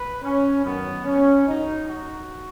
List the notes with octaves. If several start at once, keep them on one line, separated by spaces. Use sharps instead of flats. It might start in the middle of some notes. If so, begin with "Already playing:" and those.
Already playing: B4
C#4
F#2 D#3 F#3 B3
C#4
F#2 F#3 D#4
F#4